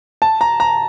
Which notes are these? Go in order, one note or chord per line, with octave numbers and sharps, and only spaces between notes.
A5
A#5
A#5